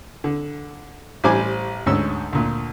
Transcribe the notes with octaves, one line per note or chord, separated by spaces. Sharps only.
D3
A1 G3 C5 G#5 D6
D2 G#2 C#4 E6
D2 A#2